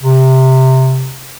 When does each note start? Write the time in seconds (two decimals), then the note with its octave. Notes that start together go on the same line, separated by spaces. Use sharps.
0.01 C3